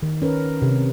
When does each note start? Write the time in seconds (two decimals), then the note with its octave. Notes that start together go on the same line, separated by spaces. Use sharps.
0.03 D#3
0.22 C#4 A#4 B4
0.62 C3